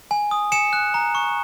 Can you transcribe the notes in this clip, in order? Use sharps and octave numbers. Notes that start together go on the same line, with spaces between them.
G#5
D#6
G#5 C#7 E7
F#6
A#5
C#6